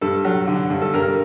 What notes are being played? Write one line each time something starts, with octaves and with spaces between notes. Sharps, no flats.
G2 A4
F#3
D3
G2
A4
G2 A#4